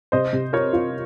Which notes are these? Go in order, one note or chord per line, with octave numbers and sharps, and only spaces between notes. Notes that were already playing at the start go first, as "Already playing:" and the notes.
C3 C5 D#5
C3
F4 A#4 C#5
F4